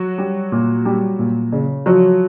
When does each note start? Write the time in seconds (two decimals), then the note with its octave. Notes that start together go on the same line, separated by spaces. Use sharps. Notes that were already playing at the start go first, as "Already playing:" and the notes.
Already playing: F#3 F#4
0.18 G3
0.52 A#2
0.85 G3
1.19 A#2
1.53 C#3
1.86 F3 F#3 F#4